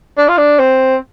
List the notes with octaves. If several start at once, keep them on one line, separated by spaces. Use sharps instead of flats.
D4
F4
D4
C4